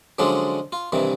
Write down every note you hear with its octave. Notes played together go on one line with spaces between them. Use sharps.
D3 F3 F#3 G#3 C#4 D4
F4
G2 C3 D#3 E3